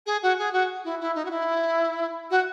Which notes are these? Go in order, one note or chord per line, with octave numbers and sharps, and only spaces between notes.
G#4
F#4
G#4
F#4
E4
E4
D#4
F#4
E4
F#4